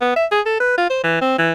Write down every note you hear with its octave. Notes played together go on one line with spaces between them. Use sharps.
B3
E5
G#4
A4
B4
F4
C5
E3
C4
E3